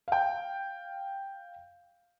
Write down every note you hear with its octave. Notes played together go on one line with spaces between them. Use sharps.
F5 G5